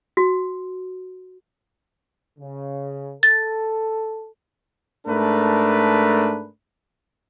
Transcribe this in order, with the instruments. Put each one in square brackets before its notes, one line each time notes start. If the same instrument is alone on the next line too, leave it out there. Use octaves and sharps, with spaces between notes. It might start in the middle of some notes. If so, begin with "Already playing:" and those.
[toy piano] F#4
[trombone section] C#3
[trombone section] A4 [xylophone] A6
[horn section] G#2 A3 D4 A#4 B4